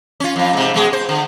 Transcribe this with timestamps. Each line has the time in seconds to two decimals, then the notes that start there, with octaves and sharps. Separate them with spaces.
0.20 C#4 F4
0.36 F2 F4
0.53 G#2 C3
0.74 B2 G#3 G#4
0.93 C5
1.09 D3